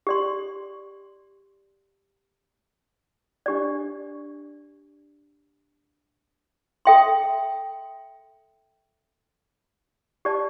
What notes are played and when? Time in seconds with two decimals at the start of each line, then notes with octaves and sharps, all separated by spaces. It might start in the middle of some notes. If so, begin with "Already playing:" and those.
0.07 G4 D5 C6
3.46 D4 G4 D5
6.85 A4 E5 G5 C6
10.25 G4 D5 A5